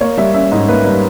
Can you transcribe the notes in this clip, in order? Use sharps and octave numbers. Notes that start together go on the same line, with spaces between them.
A#3 C#5
G3 E5
C#4 E5
G#2 D#5
A#3 B4
G3